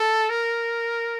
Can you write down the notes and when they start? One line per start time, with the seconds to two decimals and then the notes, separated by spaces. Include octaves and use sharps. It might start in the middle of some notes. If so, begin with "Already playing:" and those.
Already playing: A4
0.30 A#4